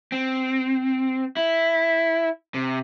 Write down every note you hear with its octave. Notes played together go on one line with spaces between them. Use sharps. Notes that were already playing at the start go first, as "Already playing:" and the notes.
C4
E4
C3